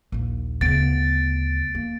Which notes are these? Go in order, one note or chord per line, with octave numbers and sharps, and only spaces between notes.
A#1 D#2
D2 C#3 B3 A6 D7
A#3